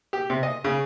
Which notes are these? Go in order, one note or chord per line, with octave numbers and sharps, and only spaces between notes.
G4
C3
D#5
C#3